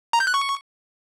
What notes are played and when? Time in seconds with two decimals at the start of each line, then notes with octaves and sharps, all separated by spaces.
0.13 A#5
0.20 G6
0.27 F#6
0.34 C#6